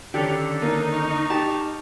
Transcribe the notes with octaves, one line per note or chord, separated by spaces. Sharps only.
D3 D#3 C#4 D4 G4 A4
A#3 D#4
C#6 F6
G4 A5